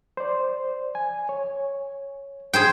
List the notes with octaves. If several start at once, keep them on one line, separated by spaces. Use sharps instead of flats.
C5 D5
G#5
C#5
G#4 C5 G5